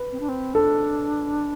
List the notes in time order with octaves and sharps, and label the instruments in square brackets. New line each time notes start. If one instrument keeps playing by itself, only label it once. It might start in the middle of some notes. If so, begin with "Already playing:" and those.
Already playing: [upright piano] B4
[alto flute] C4
D4
C4
[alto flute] D4 [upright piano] A4